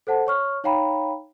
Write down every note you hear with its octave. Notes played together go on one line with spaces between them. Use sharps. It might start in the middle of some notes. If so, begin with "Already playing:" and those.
A4 C5 F#5 A5
C#5 C#6 F6
D#4 C#5 F5 G5 A#5 B5